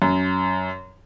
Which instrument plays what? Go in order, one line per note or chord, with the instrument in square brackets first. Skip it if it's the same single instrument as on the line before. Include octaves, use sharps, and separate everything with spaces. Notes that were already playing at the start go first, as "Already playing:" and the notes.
[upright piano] F#2